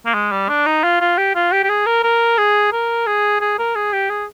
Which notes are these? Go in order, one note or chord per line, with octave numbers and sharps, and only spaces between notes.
A#3
G#3
G3
D4
D#4
F4
F4
G4
F4
G4
G4
G#4
A#4
A#4
G#4
A#4
G#4
G#4
A#4
G#4
G4
G#4